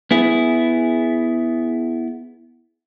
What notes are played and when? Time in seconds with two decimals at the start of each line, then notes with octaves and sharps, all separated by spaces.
0.11 B3 E4 G#4